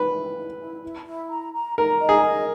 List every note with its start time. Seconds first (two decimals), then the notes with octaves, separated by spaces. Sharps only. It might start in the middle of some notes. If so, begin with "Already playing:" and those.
Already playing: B4
0.12 E4
0.36 E4
0.59 E4
0.82 E4
1.07 E4
1.31 A#5
1.54 A#5
1.78 A#4 A#5
2.01 D#5
2.09 G#4
2.24 A#4